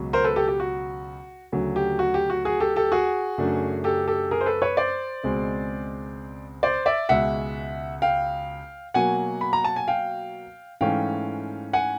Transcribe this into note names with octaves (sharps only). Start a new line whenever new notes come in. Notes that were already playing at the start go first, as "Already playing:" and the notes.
Already playing: C#2 B2 F#3
A#4 C5
A4 B4
G4 A4
G4
F#4
D2 C#3 F#3
G4
F#4
G4
F#4
F#4 G#4
G4 A4
G4 A4
F#4 G#4
F#2 C#3 F#3 A3 D4
G4 A4
G4 A4
G#4 A#4
C5
A4 B4
B4 C#5
C5 D5
C#2 B2 G#3 C4
C5 D5
D5 E5
C#2 B2 G#3 E5 F#5
F5 G5
B2 F#3 A#3 F#5 G#5
B5
A#5
A5
G#5
F5 G5
G#2 E3 A3 C#4 F5 G5
F#5 G#5